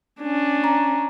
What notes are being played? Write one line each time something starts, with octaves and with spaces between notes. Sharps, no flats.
C#4 D4
A#5